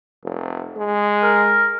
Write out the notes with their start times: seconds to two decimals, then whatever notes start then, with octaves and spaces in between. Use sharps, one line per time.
0.24 F1
0.77 G#3
1.22 A#4